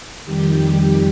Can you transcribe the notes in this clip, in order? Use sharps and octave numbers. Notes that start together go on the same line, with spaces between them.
F2 D#3 G3 G4
G4